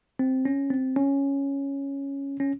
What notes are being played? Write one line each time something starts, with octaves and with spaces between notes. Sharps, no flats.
C4
C#4
C4
C#4
C#4